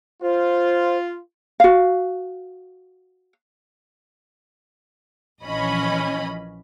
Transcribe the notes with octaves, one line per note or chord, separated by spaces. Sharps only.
F4 C5
F#4 F5
A#1 E3 F3 C#4 D#5 B5